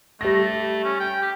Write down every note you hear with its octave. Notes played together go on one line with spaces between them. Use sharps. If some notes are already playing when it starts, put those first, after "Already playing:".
G3 A3 A#6
C#4
G5
G4